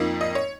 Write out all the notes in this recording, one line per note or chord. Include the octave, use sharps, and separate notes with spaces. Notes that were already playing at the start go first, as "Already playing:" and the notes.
Already playing: F2 F3 A#3 D#4
D#5
C#5